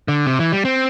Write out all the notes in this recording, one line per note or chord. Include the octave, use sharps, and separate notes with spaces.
D3
C3
E3
G3
C4